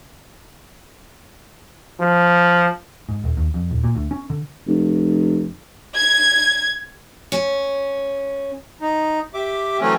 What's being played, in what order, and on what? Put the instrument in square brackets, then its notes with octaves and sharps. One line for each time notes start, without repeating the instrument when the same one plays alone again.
[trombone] F3
[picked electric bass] G#2
D#1
D#2
F2
D#1
A#2
D2
C#4
D3
[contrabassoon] F1
[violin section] G#6
[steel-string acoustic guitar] C#4
[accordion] D#4
G4 E5 D6
E3 F#3 A3 C4 C#4